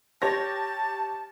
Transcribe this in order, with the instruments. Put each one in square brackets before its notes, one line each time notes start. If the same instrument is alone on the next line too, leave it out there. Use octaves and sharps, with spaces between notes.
[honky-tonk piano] G4 C#5 A#6 [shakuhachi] A5